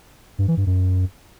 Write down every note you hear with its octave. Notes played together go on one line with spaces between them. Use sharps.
G2
E3
G2
F#2